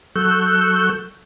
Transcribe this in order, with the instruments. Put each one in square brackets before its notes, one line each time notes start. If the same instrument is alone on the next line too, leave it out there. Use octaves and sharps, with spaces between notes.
[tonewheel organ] F#3 A4 C#6 E6 F#6 G6